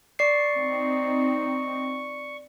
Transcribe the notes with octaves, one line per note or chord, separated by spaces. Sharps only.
D5 C#6 C7
C4 D#4